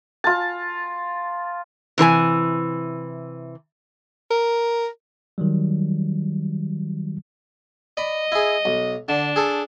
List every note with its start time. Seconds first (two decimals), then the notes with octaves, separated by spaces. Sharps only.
0.24 F4 A5
1.98 C3 E3 B4 G#5
4.31 A#4
5.38 D#3 F#3 G3
7.97 D5 D#5 B5
8.32 E4 G#4
8.65 B1
9.09 D3 D4
9.36 G#4 A4 A5